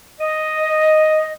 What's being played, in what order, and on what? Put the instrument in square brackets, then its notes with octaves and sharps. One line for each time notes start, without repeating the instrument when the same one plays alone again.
[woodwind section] D#5